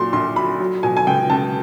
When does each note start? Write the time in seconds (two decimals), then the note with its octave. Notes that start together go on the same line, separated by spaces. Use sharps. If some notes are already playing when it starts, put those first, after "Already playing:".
Already playing: A#2 F#3 C6
0.13 A#1 C6
0.36 F#3 B5
0.60 F#3
0.83 B2 G#5
0.97 G#5
1.07 C#2 G5
1.30 C#2 A5